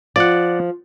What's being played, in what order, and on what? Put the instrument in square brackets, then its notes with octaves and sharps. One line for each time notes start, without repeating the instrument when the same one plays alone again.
[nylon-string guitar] F3 [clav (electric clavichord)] D5 F#5